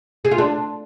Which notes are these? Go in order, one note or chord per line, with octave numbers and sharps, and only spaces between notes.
G#4
F4
D4